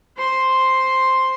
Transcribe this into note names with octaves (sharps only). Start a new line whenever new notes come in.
C5 C6